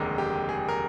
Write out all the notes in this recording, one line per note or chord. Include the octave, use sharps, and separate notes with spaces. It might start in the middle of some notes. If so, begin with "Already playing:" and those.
Already playing: F1 D#2 D3 G#3 A#4
G4
G#4
A#4